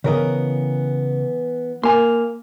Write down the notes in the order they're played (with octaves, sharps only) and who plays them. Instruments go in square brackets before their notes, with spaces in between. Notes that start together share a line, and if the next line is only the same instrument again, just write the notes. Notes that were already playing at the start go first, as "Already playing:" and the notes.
[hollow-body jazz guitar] C#3 A#4 D#5 [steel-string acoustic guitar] E3 B3
[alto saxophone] A#3 [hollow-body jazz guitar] G#5 C6